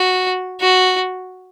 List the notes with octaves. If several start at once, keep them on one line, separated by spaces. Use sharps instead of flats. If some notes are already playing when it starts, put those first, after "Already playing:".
Already playing: F#4
F#4